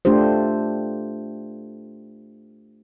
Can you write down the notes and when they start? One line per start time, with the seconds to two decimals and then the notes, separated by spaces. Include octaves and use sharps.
0.05 A3 D4 F4 G4 C5